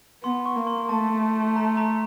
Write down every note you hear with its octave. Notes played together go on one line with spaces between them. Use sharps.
B3 C6
C#6
A#3
C6
A3 A5
A#5
A#5